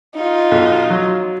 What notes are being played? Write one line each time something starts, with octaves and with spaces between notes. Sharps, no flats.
D#4 F4
B1
F#3